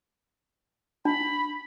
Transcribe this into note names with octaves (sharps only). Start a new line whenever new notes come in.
D4 B5